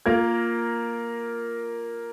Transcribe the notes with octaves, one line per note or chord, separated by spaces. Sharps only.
A#3 F4 A#4 A#5 G#6